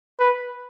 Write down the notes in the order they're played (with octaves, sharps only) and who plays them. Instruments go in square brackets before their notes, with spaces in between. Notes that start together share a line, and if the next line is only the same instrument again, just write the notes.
[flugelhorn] B4